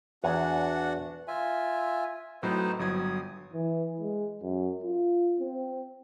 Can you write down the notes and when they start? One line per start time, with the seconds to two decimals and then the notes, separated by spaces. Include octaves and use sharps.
0.24 E2 D4 F#4 C#5 F#5 G#5
1.28 F4 E5 G#5
2.43 A2 F#3 C4 D#4 B4 C5
2.79 G1 F#3 D#6 G#6
3.53 E3
4.01 G#3
4.42 F#2
4.84 F4
5.40 C4